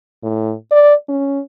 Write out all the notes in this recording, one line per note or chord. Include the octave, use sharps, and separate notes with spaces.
A2
D5
C#4